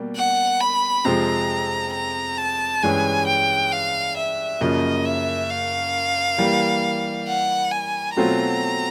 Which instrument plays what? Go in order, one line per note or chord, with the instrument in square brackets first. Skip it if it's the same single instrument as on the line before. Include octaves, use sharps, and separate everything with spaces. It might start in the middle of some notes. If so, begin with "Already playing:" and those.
Already playing: [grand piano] B2 G3 A#3
[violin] F#5
B5
[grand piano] F2 C3 F3 G#3 C4 [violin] A#5
[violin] A#5
A5
[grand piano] G2 E3 G#3 C#4 E4 [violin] G#5
[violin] G5
F5
E5
[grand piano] F#2 C#3 F3 A#3 [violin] D#5
[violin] E5
F5
[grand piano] E3 G3 A#3
[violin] F#5
G#5
[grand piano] B2 F#3 A3 C4 F4 [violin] A#5